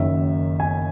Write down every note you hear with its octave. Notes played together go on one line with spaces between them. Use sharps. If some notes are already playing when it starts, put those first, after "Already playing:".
Already playing: F#1 F#2 D#3 E5
G#5